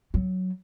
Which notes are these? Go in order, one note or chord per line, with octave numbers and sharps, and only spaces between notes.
F#3